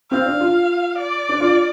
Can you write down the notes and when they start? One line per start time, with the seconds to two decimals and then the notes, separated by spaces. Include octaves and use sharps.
0.10 C4 F5
0.26 D4
0.40 F4
0.98 D5
1.29 D4
1.40 F4